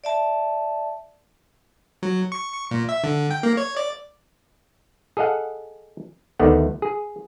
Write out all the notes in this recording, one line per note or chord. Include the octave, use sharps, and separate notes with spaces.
D5 E5 A5
F#3
C#6
C#6
A#2
E5
D3
G5
A#3
C#5
D5
G#4 A4 D#5 F5 F#5
D2 D3 D#3 A3 B3 F#5
G#4